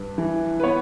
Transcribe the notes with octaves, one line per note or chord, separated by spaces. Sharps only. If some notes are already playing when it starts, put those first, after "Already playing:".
Already playing: G2 B4
E3
B4
B3 C#5